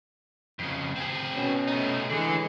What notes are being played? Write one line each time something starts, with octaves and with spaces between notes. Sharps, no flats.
F2 C#3
C4 G#4
B2 C#4
A3 D#4
D3 E3 G#3